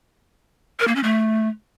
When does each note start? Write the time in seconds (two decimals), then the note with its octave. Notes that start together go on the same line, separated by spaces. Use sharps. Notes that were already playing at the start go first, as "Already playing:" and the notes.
0.80 A#4
0.88 A#3
0.96 C#4
1.04 A3